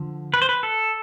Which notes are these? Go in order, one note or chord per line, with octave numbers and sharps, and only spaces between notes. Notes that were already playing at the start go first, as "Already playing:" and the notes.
Already playing: D3 F3
B4
C5
B4
A4